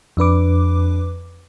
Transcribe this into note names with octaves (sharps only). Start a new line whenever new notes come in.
F2 D4 B4 D6